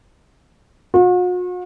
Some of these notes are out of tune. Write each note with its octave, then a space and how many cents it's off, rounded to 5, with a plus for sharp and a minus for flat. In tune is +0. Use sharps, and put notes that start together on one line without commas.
F#4 -45